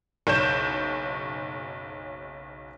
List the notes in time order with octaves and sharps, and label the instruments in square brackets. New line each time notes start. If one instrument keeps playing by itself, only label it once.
[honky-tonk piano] F#1 B1 C#5 G6 E7